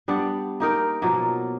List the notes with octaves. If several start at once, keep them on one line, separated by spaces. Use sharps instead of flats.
G3 B3 D4 F#5
A#3 D#4 A#4 G5
B2 F3 F#3 A#3